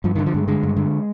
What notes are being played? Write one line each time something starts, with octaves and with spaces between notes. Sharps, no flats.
G2 F3
D3 D#3
F3
G2 G#3
D3 G#3
G2
D3